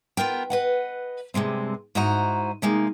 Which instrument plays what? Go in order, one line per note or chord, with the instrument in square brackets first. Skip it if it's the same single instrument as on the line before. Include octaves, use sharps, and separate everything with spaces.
[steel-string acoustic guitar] B3 F4 A#4 G5
B4 D#5 F#5
G2 C3 G#3 C4
G#2 E4 F#4 C5 D#5 A#5
C3 G#3 A#3 D#4